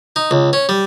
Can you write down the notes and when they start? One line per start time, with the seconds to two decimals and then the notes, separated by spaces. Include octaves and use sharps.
0.16 D#4
0.31 C#2
0.53 C#4
0.69 G3